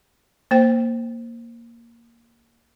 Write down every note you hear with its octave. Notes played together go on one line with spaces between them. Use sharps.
A#3 C5 G5